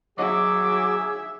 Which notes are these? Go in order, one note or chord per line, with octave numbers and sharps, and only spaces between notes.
F#3 G#4 E5 D6